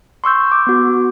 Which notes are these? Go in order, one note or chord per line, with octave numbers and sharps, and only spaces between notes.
C6 C#6 E6 G6
D6
B3 F#4